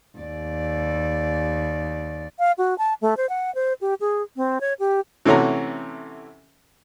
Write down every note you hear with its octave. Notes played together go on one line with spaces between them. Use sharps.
D#2 D5
F5
F#4
A5
A3
C5
F#5
C5
G4
G#4
C4
C#5
G4
C3 E3 A3 C#4 F#4 A#5